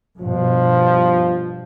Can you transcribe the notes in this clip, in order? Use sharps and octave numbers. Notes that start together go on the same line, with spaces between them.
G2 B2 F3